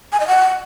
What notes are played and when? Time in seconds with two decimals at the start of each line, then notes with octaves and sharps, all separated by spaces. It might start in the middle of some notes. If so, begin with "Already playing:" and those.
0.12 G#5
0.20 D#5
0.28 F#5